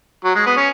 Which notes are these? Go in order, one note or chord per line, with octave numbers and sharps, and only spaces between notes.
F#3
G#3
B3
C#4